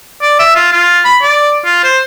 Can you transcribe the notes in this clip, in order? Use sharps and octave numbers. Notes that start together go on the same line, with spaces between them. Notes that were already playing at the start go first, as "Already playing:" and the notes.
D5
E5
F4
F4
B5
D5
F4
C5